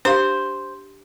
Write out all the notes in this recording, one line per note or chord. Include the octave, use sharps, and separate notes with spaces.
D4 G4 C5 F5